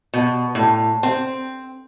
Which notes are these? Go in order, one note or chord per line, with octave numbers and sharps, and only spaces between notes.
B2
A2
C4